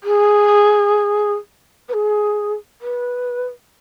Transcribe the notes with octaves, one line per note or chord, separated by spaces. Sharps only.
G#4
B4
G#4
B4